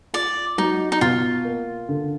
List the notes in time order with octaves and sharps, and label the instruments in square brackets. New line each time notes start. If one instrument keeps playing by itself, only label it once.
[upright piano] F4 [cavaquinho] D5
[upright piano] F#3 [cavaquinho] D#4
[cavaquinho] D#4
[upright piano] B2 [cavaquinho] F4
[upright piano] A#3
D3